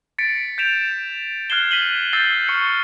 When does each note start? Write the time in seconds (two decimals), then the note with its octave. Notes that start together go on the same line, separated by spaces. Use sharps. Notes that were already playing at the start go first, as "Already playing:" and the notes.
0.18 A6 B6 C#7 D7
0.58 G6 B6 D7 E7 F7
1.50 F6 F#6 G#6 C7 E7 G7
1.71 B6 D#7 F#7 G7
2.13 E6 G6 A6 C7 F#7
2.48 C#6 F6 C#7